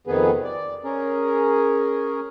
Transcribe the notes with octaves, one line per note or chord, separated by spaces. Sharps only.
F2 C3 D#3 B3 G#4 B4
D5
C#4 G#4 A#4